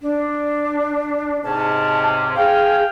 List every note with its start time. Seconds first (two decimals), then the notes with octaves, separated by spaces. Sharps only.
0.02 D4
1.44 G#2 C3 C#4 A5
2.36 G#4 F5 G5 F6